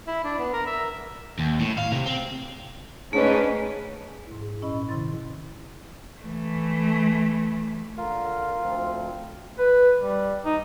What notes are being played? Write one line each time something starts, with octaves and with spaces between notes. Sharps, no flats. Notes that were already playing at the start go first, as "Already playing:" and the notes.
E4
D4
B3
A#4
E5
D#2
A2
F5
C3
C4
G#2 A3 C#4 D4 B4
G#2 E4
G#4
A#2 C#4 E4 D#5 B5
C3 D#3 C6 A6
E3 A3
D3 F4 A#4
D2 F3 C4
B4
G3
D#4